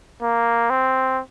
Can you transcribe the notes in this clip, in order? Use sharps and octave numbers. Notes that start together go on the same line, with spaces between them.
A#3
C4